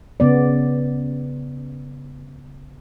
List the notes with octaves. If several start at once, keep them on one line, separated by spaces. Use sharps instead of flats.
C#3 B3 D5